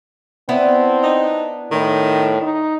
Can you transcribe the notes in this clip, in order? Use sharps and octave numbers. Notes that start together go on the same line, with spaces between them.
B3 C4 D4 E4
D#4
A2 D#3
D#4